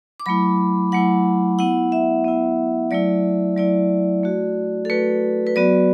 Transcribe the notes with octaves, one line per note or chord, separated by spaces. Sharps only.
D6
F#3 A3 E4 B5
F#3 A3 E4 F#5
B3 E4 F#5
E5
B3 E4
F#3 A3 E4 D5
F#3 A3 E4 D5
A3 F#4
A4
A3 F#4 B4
B4
F#3 B3 F#4 D5